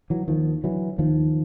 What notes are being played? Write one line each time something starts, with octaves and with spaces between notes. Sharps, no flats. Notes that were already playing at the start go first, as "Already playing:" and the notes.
E3 F#3
D#2 D#3 F3
D3 E3 F#3
D#2 D#3 F3